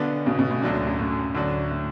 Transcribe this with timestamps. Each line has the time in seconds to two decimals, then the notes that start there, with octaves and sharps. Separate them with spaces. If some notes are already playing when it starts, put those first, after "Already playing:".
Already playing: B1 D3 B3 D4
0.26 B1 B2
0.38 B1 B2
0.51 A2
0.62 D2 A2 D3 F#3 D4
0.74 A2
0.87 F#2
0.99 A2
1.35 D2 D3 F#3 D4
1.71 A2